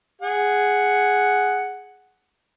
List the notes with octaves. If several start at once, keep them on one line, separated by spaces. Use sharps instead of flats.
G#4 F#5